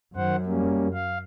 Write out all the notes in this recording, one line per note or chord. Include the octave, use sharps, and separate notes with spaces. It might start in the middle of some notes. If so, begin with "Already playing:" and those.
F#2 D#3 C5 F#5
G3 A#3 C#4
F5